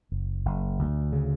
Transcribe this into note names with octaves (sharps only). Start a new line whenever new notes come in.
F#1
F#1
D2
C#3